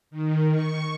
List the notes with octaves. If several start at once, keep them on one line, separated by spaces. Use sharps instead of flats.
D#3
C#6